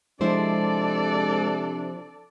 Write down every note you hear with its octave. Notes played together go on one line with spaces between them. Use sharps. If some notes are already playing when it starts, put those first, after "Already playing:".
C3 F3 G#3 D4 E4 A4 C5 D5